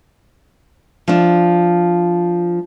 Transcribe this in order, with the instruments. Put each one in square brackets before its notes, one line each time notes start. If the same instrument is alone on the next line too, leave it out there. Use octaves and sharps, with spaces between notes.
[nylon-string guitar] F3 D4